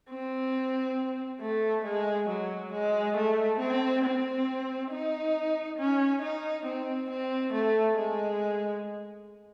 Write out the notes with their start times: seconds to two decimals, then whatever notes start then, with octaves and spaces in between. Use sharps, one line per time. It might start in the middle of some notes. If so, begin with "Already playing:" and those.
0.10 C4
1.41 A3
1.85 G#3
2.29 F#3
2.72 G#3
3.16 A3
3.59 C4
4.04 C4
4.91 D#4
5.79 C#4
6.22 D#4
6.66 C4
7.10 C4
7.53 A3
7.97 G#3